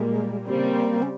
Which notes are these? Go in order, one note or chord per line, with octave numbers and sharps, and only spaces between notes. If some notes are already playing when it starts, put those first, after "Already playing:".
Already playing: A#2 G3 G#3 A#3
C#3 G3 A#3 C4
C#4